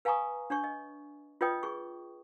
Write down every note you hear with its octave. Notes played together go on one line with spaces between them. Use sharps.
B4 F5 G#5 A#5 C#6 D#6
D4 C#5 C#6
D#5
F4 B4 C#5 D#5 G5 D#6
G#4 C#6